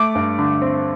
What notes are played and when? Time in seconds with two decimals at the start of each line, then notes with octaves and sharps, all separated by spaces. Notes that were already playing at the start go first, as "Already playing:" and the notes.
Already playing: A3 D6
0.15 G2
0.39 D3
0.62 C4